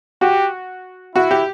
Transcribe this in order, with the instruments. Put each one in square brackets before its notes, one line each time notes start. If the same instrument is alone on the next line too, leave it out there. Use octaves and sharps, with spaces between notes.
[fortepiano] F#4 [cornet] G4
[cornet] E4 [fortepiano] F#4
[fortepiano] G4